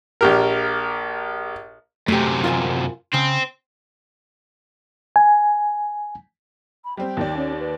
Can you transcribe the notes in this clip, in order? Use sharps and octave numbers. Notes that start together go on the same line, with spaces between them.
A#1 G4 A#4
F#2 C3 A3 G4
F4 A#4 G#5
C#3 C4
G#5
B5
G3 C4 G5
D#2 D#3 D5
C#4
B4